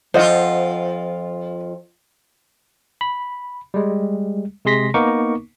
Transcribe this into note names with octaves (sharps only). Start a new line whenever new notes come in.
F2 F4 C5 D#5 F#5
B5
G3 G#3
C3 G#3 G#4 C6 A#6 B6
A#3 B3 D#4 A#4 C#6 D6